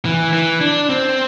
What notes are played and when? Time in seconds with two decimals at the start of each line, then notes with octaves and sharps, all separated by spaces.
0.05 E3
0.33 E3
0.61 D4
0.89 C4